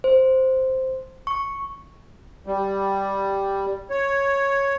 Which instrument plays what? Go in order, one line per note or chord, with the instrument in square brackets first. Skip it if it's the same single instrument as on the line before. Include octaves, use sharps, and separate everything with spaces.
[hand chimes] C5
C#6
[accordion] G3
C#5